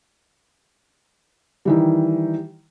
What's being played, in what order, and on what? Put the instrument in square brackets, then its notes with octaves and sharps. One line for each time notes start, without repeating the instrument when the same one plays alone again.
[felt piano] D#3 E3 G3